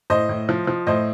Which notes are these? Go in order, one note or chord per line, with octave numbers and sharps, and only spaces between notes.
A2 C5 D#5
A2
F3
F3
A2 C5 D#5